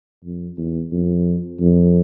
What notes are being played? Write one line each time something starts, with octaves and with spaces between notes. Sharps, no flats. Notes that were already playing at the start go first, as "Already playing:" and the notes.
F2
E2
F2
F2